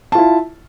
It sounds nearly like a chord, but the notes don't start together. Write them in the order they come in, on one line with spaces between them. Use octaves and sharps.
A5 F4 E4